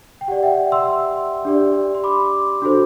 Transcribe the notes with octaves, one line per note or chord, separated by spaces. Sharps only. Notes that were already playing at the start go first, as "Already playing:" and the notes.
G5
G4 D5 F#5
E5 G5
C6 E6
D4 G4 D5
C6
B5 D6
D4 F#4 A4 C5